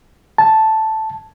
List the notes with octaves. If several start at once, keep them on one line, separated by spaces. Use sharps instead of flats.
A5